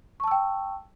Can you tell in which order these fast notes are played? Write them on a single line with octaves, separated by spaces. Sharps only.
C#6 A5 E6 G5